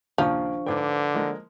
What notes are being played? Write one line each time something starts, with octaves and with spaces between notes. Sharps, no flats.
D#2 A#2 C#3 F3 D4 C#6
G#2 D3 B4 G5 D6
F3 G#3 A#3